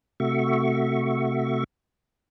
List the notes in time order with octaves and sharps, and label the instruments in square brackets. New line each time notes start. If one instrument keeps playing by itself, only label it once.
[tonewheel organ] C3 A3 F#4 E5 C#6